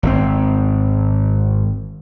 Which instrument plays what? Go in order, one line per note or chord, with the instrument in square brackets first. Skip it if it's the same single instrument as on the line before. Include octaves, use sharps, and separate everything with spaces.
[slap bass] G#1 C#3 C4